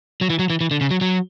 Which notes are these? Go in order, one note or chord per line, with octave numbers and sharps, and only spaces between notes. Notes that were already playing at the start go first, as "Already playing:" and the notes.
F#3
E3
F#3
E3
E3
D3
C#3
F#3
F#3